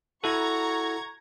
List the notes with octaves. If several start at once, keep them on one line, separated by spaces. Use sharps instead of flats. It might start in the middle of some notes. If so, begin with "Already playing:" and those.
E4 F#4 A4 A#5 C#6 G#6